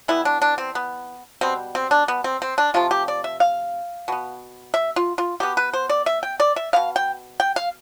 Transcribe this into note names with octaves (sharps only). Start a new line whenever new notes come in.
E3 G3 B3 E4
D4
D4
C4
B3
B2 G3 B3 C4
C4
D4
B3
C4
C4
D4
C3 F3 A3 F4
G4
D5
E5
F5
B2 B3
E5
F4
F4
B2 B3 G4
B4
C5
D5
E5
G5
D5
E5
B2 B3 F5
G5
G5
F5